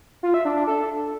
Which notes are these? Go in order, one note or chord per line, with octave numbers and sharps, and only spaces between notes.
F4
E5
D4
D4
A4